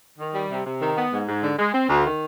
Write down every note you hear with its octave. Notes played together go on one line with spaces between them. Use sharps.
D#3
G3
C3
C3
D#3
B3
G#2
G#2
D3
G#3
C4
D2
D#3